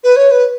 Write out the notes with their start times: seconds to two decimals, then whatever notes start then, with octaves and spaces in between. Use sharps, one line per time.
0.03 B4
0.16 C#5
0.31 B4